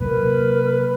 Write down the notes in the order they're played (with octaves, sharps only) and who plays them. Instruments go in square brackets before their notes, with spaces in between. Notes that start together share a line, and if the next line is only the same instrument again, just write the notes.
[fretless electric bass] C3 F#3 A#3 [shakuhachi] A#4 [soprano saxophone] B4